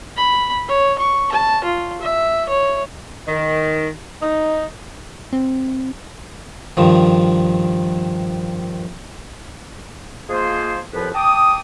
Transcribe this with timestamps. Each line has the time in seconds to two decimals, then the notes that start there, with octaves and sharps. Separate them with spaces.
0.17 B5
0.68 C#5
0.99 C#6
1.32 A5
1.64 F4
2.01 E5
2.49 C#5
3.28 D#3
4.22 D#4
5.33 C4
6.77 G2 D#3 F3
10.29 F3 G#3 A#3 F4 G#4 C5
10.93 C2 F2 A2 F3 B4
11.14 G5 A5 D6 D#6